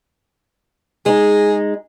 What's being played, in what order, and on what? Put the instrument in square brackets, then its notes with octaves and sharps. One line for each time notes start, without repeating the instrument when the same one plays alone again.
[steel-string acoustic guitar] G#3 D#4 [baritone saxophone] G#4